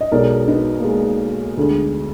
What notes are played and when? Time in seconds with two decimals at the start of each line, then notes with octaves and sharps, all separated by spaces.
0.01 D#5
0.12 B1 B2 G#3 A#4 D5
0.48 B3 D#4
0.79 A#3
0.85 G#3 B3
1.57 D2 D3 G#3